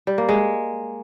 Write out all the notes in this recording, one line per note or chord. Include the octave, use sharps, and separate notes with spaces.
G3
A#3
G#3